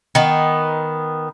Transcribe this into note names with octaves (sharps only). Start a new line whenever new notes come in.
D#3 B3